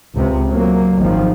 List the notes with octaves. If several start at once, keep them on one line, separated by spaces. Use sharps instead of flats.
C#2 C3
F#3 A#3
G#1 D#3 F3